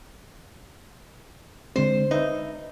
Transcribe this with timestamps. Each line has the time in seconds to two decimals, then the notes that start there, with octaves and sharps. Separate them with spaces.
1.76 D3 G#3 C4 C5
2.11 D#4 B4 E5